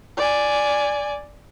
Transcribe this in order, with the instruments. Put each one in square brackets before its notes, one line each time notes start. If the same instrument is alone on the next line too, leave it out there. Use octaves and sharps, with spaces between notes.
[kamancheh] D5 G#5